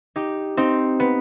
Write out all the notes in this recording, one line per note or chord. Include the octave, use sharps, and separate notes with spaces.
D#4 G4
C4 D#4
B3